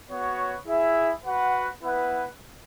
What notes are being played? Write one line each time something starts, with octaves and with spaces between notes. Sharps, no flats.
B3 F#4 C#5
E4 G#4 E5
F#4 B4 F#5
B3 E4 B4 F#5